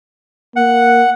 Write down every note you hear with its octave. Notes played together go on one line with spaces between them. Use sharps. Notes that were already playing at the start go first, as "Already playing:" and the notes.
A#3 F#5